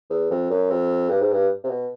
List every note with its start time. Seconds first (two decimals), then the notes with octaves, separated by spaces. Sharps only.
0.10 E2
0.31 F2
0.50 F#2
0.71 F2
1.09 G2
1.21 G#2
1.32 G2
1.64 C3
1.69 B2